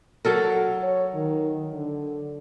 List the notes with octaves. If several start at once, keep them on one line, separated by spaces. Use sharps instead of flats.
F#3 A4 A#4
C#5
D#3
D3